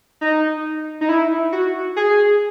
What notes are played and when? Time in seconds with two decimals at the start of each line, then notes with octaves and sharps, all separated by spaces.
0.21 D#4
1.01 D#4
1.09 E4
1.52 F#4
1.96 G#4